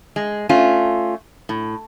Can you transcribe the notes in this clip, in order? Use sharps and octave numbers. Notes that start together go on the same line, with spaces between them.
G#3
A3 C#4 F4
A2